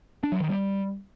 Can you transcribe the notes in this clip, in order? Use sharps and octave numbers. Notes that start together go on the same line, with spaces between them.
D4
F#3
D#3
G3